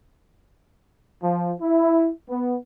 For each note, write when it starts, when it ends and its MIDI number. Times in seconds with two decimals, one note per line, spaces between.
1.21 1.52 53
1.59 2.09 64
2.28 2.54 59